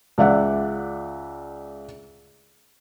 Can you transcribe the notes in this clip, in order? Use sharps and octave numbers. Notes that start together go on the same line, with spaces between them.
C#2 D5 E5 F#5